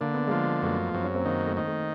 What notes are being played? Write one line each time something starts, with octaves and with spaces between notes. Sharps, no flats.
D3 A#3
B3
F3 G#3 A#3
F#2 A3 B3
F#2 C4
C#4
A#3 C4
D#3 A#3 C4
A3
D#3
A3